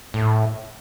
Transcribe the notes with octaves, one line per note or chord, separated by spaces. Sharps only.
A2